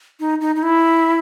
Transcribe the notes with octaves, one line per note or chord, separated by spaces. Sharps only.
D#4
D#4
D#4
E4